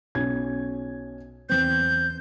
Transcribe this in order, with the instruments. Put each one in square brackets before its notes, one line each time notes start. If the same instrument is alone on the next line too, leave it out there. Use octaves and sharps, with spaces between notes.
[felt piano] B1 C#4 G#6
[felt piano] E2 C4 [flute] G6